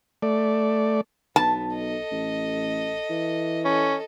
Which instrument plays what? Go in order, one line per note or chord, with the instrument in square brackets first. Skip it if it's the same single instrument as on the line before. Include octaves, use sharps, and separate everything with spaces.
[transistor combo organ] A3 D5
[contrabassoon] B1 [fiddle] B3 [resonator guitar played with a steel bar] A5
[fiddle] A4 D#5
[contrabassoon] A1
E3
[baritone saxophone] C#4 [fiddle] A4 D#5